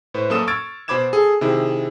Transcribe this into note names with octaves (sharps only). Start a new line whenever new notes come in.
A2 B4 C5
F#2 A#3 A4 D#6 E7
C#6 E6 F6 G#6 A6 D7
B2 C5 B5 D6 G#6 E7
G#4 A4
C3 D#3 E4 G#4